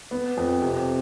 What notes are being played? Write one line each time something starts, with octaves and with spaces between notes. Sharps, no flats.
B3
F2
C3